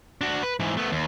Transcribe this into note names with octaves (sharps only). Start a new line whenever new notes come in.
D4 F#4
B4
G#2 E3
A3 B3
D#2